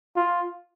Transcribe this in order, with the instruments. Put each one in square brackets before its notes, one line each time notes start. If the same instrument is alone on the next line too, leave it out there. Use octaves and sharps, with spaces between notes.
[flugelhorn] F4